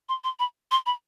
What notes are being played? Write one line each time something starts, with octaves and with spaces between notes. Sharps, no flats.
C6
C6
B5
C6
B5